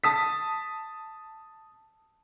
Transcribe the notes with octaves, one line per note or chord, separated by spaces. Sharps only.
A5 D#6 B6